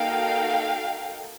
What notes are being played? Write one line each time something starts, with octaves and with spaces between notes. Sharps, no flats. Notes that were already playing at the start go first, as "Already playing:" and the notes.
Already playing: A#3 D#4 F#4 A4 F5 G5